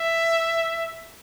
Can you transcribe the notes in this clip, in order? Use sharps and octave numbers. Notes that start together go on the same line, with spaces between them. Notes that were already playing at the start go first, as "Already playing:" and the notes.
Already playing: E5